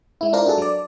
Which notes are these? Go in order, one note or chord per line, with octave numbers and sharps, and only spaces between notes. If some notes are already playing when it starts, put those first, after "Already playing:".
G#3 E4
D4 E4 F4 A#4 C5
D4 F#4 G#4 A4
F#3 D5